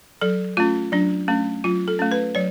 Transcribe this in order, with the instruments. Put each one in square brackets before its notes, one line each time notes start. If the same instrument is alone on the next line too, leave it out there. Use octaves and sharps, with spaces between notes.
[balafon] F#3 A4
A3 C#4 F4
F#3 D4
A3 C#4
F#3 F4
A4
A3 C#4
B4
F#3 C#5